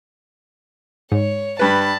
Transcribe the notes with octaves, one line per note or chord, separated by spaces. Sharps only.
G#2 C#5
G2 B4 A5 B5